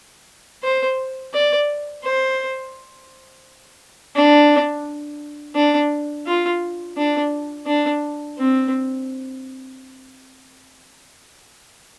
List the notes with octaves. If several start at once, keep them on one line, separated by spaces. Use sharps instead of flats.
C5
D5
C5
D4
D4
F4
D4
D4
C4